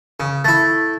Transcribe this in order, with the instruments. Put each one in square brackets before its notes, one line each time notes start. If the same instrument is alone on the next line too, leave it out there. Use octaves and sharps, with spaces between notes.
[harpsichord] C#3
[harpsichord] A3 E4 [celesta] A6